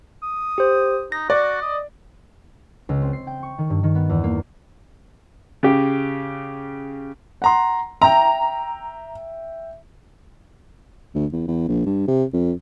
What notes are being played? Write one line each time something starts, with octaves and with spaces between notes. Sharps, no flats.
D#6
G4 C5
D#4 A#6
F#4 D5
D#5
C#2
C4
C7
G5
C#6
D#3
G2
D#3
B3
E2
A#3
C#3 G4
F#5 A#5 C6
E5 G5 A#5
D2
E2
E2
A#1
G2
C3
F2